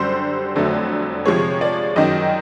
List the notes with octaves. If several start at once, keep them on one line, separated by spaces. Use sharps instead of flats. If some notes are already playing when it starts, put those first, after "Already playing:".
Already playing: F#2 D3 G3 C5
F2 D3 F#3 A3
C3 F3 G#3 C#5
D5
F#2 D#3 F#3 D#5